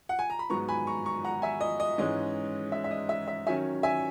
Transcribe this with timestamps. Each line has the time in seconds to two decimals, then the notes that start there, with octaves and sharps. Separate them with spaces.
0.09 F#5
0.19 G#5
0.30 A#5
0.39 B5
0.50 G#2 F#3 B3 A#5 C#6
0.69 G#5 B5
0.87 A#5 C#6
1.06 A#5 C#6
1.24 F#5 A#5
1.42 E5 G#5
1.61 D#5
1.80 D#5
1.98 G#2 E3 G#3 C#4 D#5
2.72 E5
2.84 E5
2.91 D#5
3.09 E5
3.28 E5
3.47 D#3 F#3 C#4 E5 G#5
3.83 E5 G#5